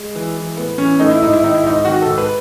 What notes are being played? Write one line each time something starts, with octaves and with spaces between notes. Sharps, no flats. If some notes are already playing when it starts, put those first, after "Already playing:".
Already playing: G#3
E3
E3
A2 B3
E3 C#4
A2 D#4
E4
G#2 D#4
E4
D#3 D#4
E4
G#2 D#4
D#3 F#4
G#2 A4
B4